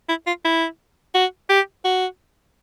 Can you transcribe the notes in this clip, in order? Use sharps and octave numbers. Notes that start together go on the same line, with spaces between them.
E4
F4
E4
F#4
G4
F#4